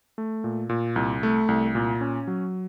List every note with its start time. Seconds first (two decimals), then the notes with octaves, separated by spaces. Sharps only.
0.18 A3
0.44 A#2
0.69 A#2
0.96 C2
1.23 A3
1.48 C2
1.75 A#2
2.01 C#4
2.27 F#3